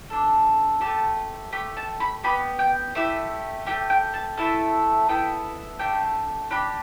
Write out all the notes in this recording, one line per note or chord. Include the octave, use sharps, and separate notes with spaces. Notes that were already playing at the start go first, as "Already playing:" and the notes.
D4 A4
A3 G4 A5
A3 G4 B5
A5
B5
B3 G4 B5
G5
A3 E4 G4 E5
A3 E4 G4 G5
G5
A5
A3 E4 A4 A5
B3 E4 A4 G5
A3 D4 G4 G5
D4 G4 B5